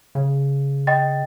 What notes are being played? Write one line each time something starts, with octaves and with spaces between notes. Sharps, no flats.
C#3
D#5 G5 A6